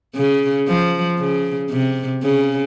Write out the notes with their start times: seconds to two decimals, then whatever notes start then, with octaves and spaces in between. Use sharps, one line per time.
0.15 C#3
0.68 F3
1.19 C#3
1.71 C3
2.23 C#3